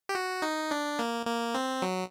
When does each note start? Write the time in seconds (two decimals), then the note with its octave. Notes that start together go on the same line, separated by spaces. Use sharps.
0.09 G4
0.15 F#4
0.42 D#4
0.71 D4
0.99 A#3
1.26 A#3
1.54 C4
1.82 F#3